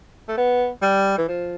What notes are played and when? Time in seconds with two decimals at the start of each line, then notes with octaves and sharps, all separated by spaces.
0.28 A3
0.38 B3
0.82 G3
1.18 E3
1.28 F3